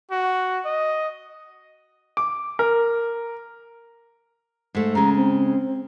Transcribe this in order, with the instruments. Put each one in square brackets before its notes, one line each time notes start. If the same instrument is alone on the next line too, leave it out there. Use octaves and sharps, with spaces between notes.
[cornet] F#4
D#5
[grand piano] D6
A#4
[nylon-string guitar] G#2 A3
[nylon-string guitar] C#3 G#3 [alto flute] A#5
[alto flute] C4